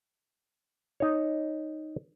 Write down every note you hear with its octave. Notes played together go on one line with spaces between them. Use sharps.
D#4 C#5